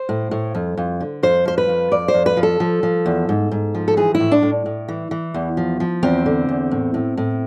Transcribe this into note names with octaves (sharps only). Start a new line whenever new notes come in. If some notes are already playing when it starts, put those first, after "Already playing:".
Already playing: C5
A2
A2
F2
F2
D3
F2 C5
F3 C5
B4
F2
F2 D5
C5
F2
B4
F3
A4
F3
F3
E2
G#2
G#2
F3
A4
E3 G#4
E4
A2
D4
A2
A2
E3
E3
E2
F3
F3
E2 C4
D3
E2
A2
A2
A2